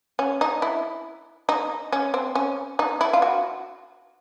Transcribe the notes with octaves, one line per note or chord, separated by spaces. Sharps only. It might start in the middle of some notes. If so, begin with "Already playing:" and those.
C#4
D#4
E4
D#4
C#4
C4
C#4
D#4
E4
F4
F#4